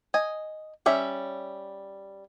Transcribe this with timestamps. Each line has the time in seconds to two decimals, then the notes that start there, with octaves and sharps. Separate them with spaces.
0.14 D#5 G#5
0.86 G3 C#4 E5